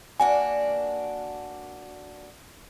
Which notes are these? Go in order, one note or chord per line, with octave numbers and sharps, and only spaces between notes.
A#3 D4 F#4 G#5